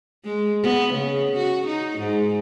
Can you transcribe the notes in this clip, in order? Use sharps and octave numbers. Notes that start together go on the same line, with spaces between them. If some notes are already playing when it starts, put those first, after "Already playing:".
G#3
B3
C#3
F#4
D#4
G#2